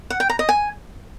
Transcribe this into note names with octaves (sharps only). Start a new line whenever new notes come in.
F#5
G5
A#5
D#5
G#5